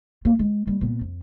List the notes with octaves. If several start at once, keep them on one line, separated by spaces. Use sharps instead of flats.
A#3 F4
G#3
G3 A#3
A#2 B3
F2